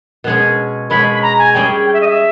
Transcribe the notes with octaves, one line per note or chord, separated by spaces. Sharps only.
B2 G#3 C#4 G#4
B2 G#3 C#4 G#4 B5
B5
A#5
G#5
G3 C#4 G#4 G5
G5
E5
D#5
E5